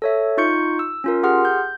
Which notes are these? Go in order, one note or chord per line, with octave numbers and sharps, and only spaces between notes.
A4 C#5 E5
D#4 F4 C#6 G6 C#7
E6
C#4 F4 A#4
G4 G#4 F#5 C6 F6
G6